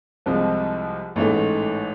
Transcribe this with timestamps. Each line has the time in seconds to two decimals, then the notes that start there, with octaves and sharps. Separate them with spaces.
0.26 C2 C3 F3 G#3 C4
1.16 A1 G#2 E3 A3